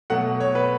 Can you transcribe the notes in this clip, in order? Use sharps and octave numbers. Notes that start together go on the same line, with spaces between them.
B2 F#3 A3 F#5
C#5
B4